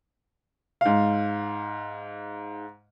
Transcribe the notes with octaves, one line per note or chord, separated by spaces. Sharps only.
G#2 F5